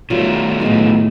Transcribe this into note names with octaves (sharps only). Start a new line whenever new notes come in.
B2 D#3 F#3 G3 A3 F4
B1 A2 G#3 B5